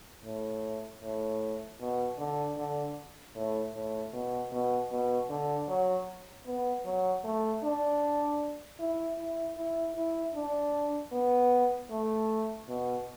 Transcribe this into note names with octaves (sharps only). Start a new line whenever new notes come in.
A2
A2
B2
D3
D3
A2
A2
B2
B2
B2
D3
F#3
B3
F#3
A3
D4
E4
E4
E4
E4
D4
B3
A3
B2